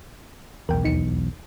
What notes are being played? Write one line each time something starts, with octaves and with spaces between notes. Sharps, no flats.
B1 E2 A#4 G5
D#2 D#4 C#7